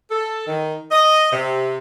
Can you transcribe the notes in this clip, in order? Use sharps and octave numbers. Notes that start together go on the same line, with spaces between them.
A4
D#3
D#5
C3